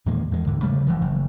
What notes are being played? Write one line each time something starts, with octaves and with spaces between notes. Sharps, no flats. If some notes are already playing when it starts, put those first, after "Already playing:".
E2 A#2 D#3 G#3
E2 G#3
C#2 G#2 D3
C#3 G3 A3
E1 D#2 E3 F3
F#1